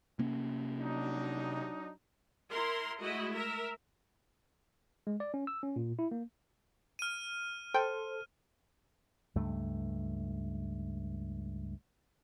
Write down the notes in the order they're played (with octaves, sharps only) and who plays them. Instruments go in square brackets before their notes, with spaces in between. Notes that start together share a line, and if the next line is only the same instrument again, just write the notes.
[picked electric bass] C3 A#3 C#4
[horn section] F#3 D4 D#4
[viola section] E4 A#4 C6
G#3 A3 E4 F#4 D#5
A#4 E5
[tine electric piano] G#3
D5
C#4
E6
C#4
A#2
E4
A#3
[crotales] F6 D#7
[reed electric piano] A4 [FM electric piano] C5 [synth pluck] G5
[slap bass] C#2 G2 A3